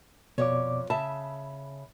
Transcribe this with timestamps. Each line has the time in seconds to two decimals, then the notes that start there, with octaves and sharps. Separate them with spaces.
0.38 F2 B2 C#5 D5 D6
0.90 C#3 E5 A5 B5